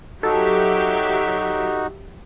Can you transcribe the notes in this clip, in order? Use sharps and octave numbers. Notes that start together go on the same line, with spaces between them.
F#3 D#4 F#4 G4 A4 E5